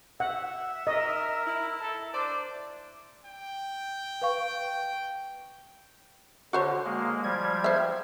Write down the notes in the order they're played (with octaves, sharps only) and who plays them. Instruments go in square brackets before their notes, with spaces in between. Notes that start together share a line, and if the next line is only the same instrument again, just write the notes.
[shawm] E5 [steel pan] F#5
[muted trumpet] A#4 [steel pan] D#5
[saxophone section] E4
[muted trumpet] A4
[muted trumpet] D4 [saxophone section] C5 D5
[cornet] G5
[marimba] B4 F5 C#6
[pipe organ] D3 [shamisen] F#4 C5 C#5
[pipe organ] G#3 A#3
F3 G3 G#6
[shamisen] C5 E5